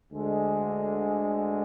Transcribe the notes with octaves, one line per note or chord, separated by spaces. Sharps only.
D2 D3 G#3